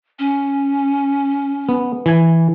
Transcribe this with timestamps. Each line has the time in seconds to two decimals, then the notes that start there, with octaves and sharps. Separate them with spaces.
0.19 C#4
1.69 B3
2.06 E3 G#5